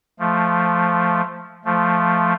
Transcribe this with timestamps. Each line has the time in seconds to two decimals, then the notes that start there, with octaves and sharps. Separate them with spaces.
0.20 F3 A3
1.65 F3 A3